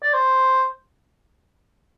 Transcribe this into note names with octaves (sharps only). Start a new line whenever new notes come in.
D5
C5